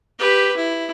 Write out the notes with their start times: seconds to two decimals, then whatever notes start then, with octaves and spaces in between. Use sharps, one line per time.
0.19 G4 B4
0.57 E4